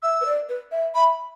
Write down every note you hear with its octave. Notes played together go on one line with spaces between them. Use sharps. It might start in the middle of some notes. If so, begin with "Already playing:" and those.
E5 E6
B4
D5
B4
E5
E5 B5